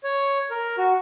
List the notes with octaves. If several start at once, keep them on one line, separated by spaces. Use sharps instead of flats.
C#5
A#4
F#4